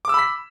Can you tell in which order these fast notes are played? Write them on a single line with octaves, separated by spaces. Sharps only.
D6 E6 B5 B6